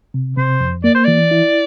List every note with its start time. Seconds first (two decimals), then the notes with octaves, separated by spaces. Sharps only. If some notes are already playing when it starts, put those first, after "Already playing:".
0.14 C3
0.37 C3 C5
0.61 F2
0.84 A#3 D5
0.95 C5
1.05 E3 D5
1.31 E4